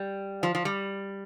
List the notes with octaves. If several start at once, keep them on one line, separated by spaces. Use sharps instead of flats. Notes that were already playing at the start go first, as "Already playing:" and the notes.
Already playing: G3
F3
F3
G3